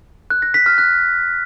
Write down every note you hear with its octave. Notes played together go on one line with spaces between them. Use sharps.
F#6
A#6
B6
F6
F#6